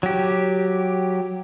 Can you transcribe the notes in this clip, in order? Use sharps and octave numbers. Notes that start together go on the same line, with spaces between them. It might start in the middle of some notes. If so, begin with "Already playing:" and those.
F#3 G4